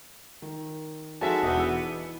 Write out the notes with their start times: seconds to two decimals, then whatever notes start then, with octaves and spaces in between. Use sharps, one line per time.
0.42 D#3
1.21 F2 G#3 D#4 F#4 A4 E5 G#5 A5
1.42 E1 B3 D4 D#4 D#6 B6
1.57 E3 E6